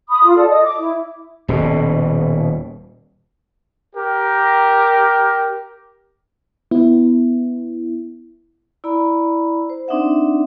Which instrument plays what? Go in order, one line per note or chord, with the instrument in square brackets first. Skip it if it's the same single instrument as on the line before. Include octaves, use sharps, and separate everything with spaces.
[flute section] B5 D#6
F4
A4 D5
D#5 D#6
D6
E4
[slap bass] D#1 B2
[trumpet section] G4 A#4
[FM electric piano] B3 E4
[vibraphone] E4 D5 A#5 B5
C5
C4 D4 D#4 D5 E5 F#5